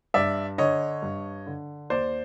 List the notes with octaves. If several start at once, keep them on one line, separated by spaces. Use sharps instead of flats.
G2 D5 E5
D3 C#5 D#5
G2
D3
D#2 C5 D5